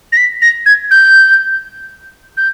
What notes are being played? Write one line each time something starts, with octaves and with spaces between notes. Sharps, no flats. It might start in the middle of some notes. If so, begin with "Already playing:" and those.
A#6
B6
A#6
G#6
G6
G6